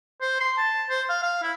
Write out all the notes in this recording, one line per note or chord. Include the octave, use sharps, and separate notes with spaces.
C5
C6
A5
C5
F5
F5
E4